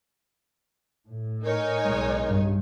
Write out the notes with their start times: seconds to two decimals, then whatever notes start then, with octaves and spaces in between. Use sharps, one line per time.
1.09 A2
1.43 D#4 A#4 C#5 G#5
1.82 B1 G#3
2.27 G2